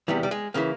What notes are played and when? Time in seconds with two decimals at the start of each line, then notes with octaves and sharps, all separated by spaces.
0.08 E2 C3 E3 G3
0.23 G3
0.31 G#3
0.54 C#3 E3 A#3